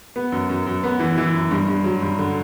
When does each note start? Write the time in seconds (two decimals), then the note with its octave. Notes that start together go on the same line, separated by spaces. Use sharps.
0.16 B3
0.32 F#2
0.49 F#2
0.66 F#2
0.84 B3
0.99 E3
1.18 E3
1.34 F#2
1.51 G2
1.68 G2
1.84 F#3
2.02 G2
2.19 D3